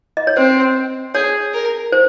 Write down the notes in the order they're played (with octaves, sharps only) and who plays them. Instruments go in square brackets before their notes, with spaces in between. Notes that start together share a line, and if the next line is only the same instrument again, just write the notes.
[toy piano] D#5
C#5
[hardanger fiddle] C4 [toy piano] C5
[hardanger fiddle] G#4 [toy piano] C#5
[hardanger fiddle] A#4
[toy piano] C5